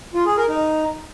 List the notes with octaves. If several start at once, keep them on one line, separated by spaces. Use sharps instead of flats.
F4
G#4
A#4
D#4